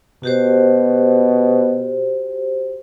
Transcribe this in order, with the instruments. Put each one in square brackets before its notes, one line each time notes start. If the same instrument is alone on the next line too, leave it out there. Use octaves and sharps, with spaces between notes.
[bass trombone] B2 [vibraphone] F#4 G4 C5